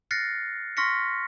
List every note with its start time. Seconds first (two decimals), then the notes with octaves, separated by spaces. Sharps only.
0.11 F6 F#6 A6 A#6 C7 C#7
0.77 C6 C#6 F6 A#6 B6 C#7